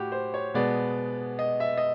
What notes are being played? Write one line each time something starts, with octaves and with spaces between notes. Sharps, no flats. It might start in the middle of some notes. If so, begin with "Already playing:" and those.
Already playing: A2 F#4 G4
C5
C#5
B2 G#3 B3 D5
D#5
E5
D#5